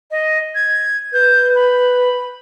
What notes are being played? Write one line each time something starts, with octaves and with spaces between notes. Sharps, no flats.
D#5
G#6
B4 G6
B5